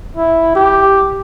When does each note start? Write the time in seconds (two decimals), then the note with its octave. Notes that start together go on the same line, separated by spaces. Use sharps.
0.17 E4
0.56 G4